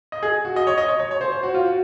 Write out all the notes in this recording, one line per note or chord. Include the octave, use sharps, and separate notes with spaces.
D#5
G#4
F#4
D#5
C#5
D#5
C#5
C#5
C#5
C5
C5
F#4
F4
F#4